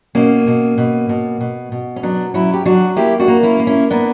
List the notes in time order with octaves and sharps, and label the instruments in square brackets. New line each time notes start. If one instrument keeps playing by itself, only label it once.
[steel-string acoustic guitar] B2 A#3 C#4
B2
B2
B2
B2
B2
C#4
F#3 B3 D4
F#3 C#4 E4
G4
F#3 D4 F#4
A#3 E4 G4
D4 F#4
A#3
C#4 E4
A#3
C#4 E4
A#3 B3 D4